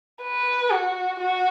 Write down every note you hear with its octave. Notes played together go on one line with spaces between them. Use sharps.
B4
F#4
F#4